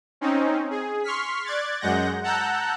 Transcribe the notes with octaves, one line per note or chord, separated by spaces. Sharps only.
C4 C#4 D#4
G#4
C6 C#6 F6 B6
D5 F#6 G#6 A6
F#2 G#3 F#5 G6 A#6
F#5 A5 A#5 E6 F#6 G6